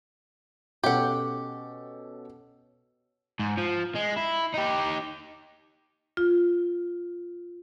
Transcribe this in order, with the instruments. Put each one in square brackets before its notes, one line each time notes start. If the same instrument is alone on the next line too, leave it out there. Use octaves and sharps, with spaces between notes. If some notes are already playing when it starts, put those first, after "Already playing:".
[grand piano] B2 C#4 A4 [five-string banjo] G4 F#5
[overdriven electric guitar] G#2
F3
G#3
E4
D#4 G4
[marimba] F4